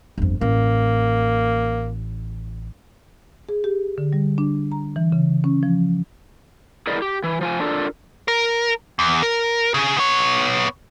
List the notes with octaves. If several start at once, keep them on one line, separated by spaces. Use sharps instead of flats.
G1 F2
A1 A#3
G#4
G4
D3
G3
D4
A#5
E3
C#3
C#4
F3
E4 G#4 A#4 B4 D5 D#5
G4
E3
F3 F4 G#5
D4 F4 A4 A#4 D5
A#4
E2
A#4
C#3 G#4
B3 C#5